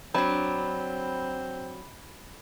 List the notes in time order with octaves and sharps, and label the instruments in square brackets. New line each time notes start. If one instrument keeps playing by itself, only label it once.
[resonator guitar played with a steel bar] F#3 D4 [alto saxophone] C4 [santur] B5